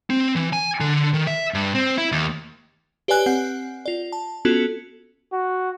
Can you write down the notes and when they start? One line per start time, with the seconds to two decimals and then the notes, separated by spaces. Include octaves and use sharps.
0.10 C4
0.36 E3
0.53 G#5
0.80 D3
1.14 D#3
1.27 E5
1.54 G2
1.75 C4
1.98 E4
2.12 D#2
3.08 G4 B4 C#5 D5 G#5 F#6
3.26 C4 F#5
3.86 F4 D5
4.12 A5
4.45 B3 C#4 F4 F#4 A4
5.33 F#4